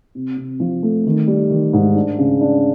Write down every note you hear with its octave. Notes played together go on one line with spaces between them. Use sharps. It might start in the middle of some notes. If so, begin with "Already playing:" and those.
C3
C3
F3
A3
D#3
G3
D#3
G#2
D4
C#3
D4